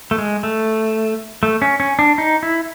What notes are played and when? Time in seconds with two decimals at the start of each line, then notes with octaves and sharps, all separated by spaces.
0.11 A3
0.18 G#3
0.43 A3
1.43 A3
1.62 C#4
1.80 C#4
1.99 D4
2.18 D#4
2.43 E4